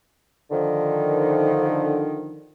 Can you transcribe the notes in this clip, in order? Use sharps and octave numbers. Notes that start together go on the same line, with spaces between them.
D3 D#3 F3